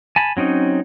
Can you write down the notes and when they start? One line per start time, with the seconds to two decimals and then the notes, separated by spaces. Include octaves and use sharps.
0.16 G#5 A5 B5
0.37 F#3 C4 C#4 D#4